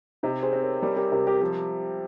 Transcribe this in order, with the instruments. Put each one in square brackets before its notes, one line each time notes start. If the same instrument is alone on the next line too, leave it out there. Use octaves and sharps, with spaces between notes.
[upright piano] C3 [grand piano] D#4 G4
[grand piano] G#4 C5
[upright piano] C4
[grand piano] A#4 C#5
[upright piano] G3 [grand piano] A#4 C#5
[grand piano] G4 A#4
[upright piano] C3 [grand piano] G4 A#4
[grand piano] G4 A#4
[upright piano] F3 [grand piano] G4 A#4